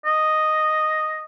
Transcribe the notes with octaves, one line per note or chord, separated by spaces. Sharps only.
D#5